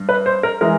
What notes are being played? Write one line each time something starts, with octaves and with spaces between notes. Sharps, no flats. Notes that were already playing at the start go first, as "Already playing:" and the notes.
Already playing: G2
B4
C5
A#4
E3 G#3 A#4